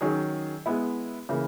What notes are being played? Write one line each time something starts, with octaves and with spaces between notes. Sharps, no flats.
D#3 F#3 C#4 G#4
G#3 B3 E4
C#3 E3 A#3